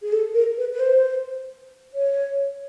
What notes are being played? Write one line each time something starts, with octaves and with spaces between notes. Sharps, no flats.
G#4
A4
A#4
B4
B4
C5
C#5